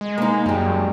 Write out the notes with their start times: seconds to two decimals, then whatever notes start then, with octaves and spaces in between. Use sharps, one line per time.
0.01 G#3
0.18 A#3 D#4
0.46 F#2 G3 G#3